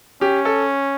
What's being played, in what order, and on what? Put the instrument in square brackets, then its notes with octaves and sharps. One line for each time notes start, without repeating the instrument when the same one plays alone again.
[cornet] C#4 [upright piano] G4
[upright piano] A4